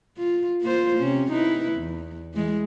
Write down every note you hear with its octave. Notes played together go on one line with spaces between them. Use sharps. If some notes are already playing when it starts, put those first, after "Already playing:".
F4
A#3 F4 C5
C3 C#4
D#4 E4 B4
E2
E3 G#3